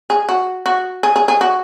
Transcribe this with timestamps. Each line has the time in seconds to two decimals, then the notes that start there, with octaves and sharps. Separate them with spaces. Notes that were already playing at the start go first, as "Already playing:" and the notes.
0.10 G#4
0.29 F#4
0.66 F#4
1.03 G#4
1.16 G#4
1.28 G#4
1.41 F#4